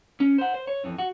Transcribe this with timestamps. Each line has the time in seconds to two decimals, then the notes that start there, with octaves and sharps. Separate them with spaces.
0.20 C#4
0.38 C5 F#5
0.54 C5
0.67 C#5
0.84 F2 E3
0.98 F#4